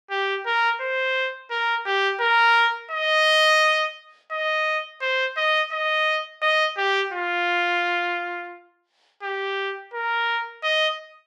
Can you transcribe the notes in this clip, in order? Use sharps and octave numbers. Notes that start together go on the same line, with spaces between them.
G4
A#4
C5
A#4
G4
A#4
D#5
D#5
C5
D#5
D#5
D#5
G4
F4
G4
A#4
D#5